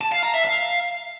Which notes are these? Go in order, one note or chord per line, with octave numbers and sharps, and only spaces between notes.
A5
F5
A#5
E5
F5